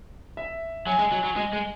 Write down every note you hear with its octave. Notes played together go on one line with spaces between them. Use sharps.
E5
F#3 G#5
G#3
F#3
F#3
G#3
G#3